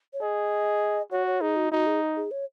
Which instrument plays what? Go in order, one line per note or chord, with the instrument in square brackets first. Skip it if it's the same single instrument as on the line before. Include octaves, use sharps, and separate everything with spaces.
[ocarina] C#5
[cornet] G#4 [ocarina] D#5
[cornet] F#4 [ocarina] C#5
[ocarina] C#5
[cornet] D#4 [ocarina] G#4
[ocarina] F#4
[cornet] D#4 [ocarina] F#4
[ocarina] G#4
G#4
C#5